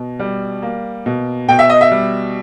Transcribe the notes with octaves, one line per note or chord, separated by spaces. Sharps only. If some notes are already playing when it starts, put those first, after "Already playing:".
Already playing: B2
G3
A#3
B2
B2 G5
E5
D#5
E5
G3